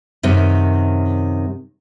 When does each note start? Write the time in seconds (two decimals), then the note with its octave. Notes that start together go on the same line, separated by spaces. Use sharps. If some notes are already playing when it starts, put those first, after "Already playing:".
0.23 F#2 C3 D#3